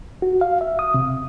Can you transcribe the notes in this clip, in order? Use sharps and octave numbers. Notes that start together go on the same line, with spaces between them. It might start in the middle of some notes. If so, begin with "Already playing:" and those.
F#4
F5
E5
D#6
C3